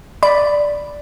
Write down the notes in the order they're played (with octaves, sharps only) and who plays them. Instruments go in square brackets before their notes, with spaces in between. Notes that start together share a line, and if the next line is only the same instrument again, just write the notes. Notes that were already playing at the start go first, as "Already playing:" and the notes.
[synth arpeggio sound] D5 B5